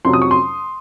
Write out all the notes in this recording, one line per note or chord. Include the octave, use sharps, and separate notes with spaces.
F2 C3 F#3 C6
D#6
C#6
C6